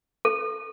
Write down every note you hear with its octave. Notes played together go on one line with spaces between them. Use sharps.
A4